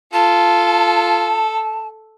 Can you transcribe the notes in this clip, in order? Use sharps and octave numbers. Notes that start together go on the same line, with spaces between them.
F4 A4 A5